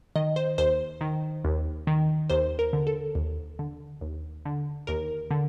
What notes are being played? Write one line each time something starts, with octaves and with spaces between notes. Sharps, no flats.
D#3 D#5
C5
D#2 C5
D#3
D#2
D#3
D#2 C5
A#4
D3
A4
D#2
D3
D#2
D3
D#2 A#4
D3